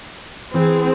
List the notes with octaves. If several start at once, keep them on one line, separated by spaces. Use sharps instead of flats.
E3 C4 G#4